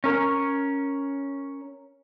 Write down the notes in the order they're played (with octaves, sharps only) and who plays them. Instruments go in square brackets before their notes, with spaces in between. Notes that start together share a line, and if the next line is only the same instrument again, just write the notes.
[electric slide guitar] C#4 A#4